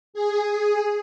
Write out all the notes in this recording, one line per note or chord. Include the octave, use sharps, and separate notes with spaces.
G#4